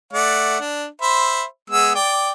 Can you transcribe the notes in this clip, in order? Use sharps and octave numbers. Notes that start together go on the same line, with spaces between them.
A3 D5 F#5
D4
C5 E5 B5
G#3 B3 E6
D5 G5